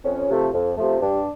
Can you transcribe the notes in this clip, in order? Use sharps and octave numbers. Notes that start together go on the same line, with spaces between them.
F2 C#4
C3 F3 A3
F2
C3 F3 A3
G2 D4